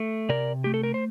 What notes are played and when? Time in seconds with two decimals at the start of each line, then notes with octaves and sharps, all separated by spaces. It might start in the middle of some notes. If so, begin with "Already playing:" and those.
Already playing: A3
0.29 C3 A#4 D5
0.64 A3 G4
0.74 A4
0.83 A#4
0.94 C5